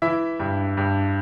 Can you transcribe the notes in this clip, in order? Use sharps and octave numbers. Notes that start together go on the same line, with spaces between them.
E3 E4 E5
G2
G2